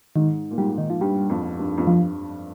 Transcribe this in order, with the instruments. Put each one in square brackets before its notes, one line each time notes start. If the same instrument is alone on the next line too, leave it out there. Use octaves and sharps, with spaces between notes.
[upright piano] G#2 [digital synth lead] D#3
[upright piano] A#2
[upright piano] G#2 [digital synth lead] G3
[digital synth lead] D#3
F3
[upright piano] G2 [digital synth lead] G3
[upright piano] F2
G2
F2
[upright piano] G2 [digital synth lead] F3